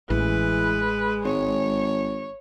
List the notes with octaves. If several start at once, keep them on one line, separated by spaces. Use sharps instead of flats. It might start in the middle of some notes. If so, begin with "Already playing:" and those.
A1 E3 G#3 B4
G#1 C#5